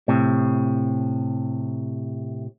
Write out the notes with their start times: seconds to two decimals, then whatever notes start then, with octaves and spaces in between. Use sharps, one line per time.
0.08 A2 C3